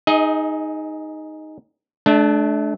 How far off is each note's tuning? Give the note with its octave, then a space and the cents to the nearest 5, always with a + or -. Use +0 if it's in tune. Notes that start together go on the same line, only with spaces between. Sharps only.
D#4 +0 G#4 +0 D#5 +35
A3 -40 D4 +0